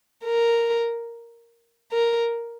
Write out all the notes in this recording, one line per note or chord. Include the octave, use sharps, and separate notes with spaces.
A#4
A#4